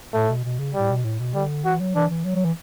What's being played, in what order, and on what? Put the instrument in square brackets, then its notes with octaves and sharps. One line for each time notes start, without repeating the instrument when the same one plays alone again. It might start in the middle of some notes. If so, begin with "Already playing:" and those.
[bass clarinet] A2 [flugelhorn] A3
[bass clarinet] B2
B2
C#3
[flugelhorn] G3
[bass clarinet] A2
B2
A2
B2
[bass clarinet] D3 [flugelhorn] G3
[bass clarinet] E3 [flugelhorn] F#4
[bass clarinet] F#3
[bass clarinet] E3 [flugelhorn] D4
[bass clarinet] E3
F#3
F#3
E3